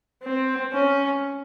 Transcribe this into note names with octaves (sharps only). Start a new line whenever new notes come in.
C4
C#4